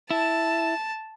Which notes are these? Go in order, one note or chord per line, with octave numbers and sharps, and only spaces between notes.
E4 A5